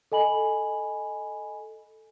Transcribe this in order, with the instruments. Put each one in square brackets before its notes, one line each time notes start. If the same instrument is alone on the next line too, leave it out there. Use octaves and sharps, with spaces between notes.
[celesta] A4 D#5 G#5 B5 F#7